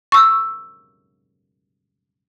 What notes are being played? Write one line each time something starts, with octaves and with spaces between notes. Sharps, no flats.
C#6 E6